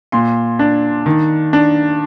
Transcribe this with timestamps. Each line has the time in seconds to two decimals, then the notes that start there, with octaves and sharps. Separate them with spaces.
0.12 A#2 C6
0.59 D4
1.06 D#3
1.53 D4